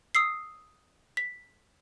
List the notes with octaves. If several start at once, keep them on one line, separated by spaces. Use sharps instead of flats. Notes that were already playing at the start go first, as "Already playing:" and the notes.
D#6 E6 C7
B6